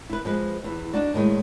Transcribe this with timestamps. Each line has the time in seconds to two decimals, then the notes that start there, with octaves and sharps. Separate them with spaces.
0.10 E4 B4
0.25 F3 G#3 B4
0.64 E2 E3
0.93 D4 D#4 F#4 D5
1.14 A2 D#3 G#3 A3